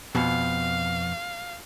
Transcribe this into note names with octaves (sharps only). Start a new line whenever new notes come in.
F2 B2 F5